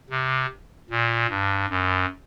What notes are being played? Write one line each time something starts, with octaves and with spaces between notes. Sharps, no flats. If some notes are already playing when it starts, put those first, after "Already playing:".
C3
A#2
G2
F#2